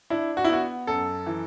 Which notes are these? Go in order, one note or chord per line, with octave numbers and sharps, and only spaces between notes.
D4 E4
F#4
E4
B3 F#4
F#2 A4
E3